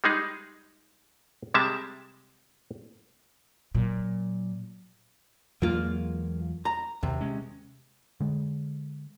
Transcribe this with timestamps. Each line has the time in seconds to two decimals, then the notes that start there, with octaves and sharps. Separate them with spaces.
0.04 G3 G#3 D#4 G#4
1.54 C3 G3 G#3 E5 A5
3.75 A#2 F#3
5.62 E2 F#3 G#3 A#3 F4
6.65 A#5
7.03 D#2 C3
7.21 G#3 C#4
8.20 D3 G#3